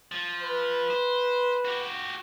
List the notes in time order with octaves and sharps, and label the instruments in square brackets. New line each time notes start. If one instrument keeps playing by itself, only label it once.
[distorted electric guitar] F3
[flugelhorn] B4
[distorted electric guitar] C5
F#4 G4